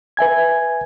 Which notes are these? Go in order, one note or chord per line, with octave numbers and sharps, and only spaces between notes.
B4 E5 G#5 G#6